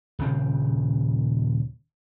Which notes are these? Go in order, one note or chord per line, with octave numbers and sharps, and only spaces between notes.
D#1 C#3 C4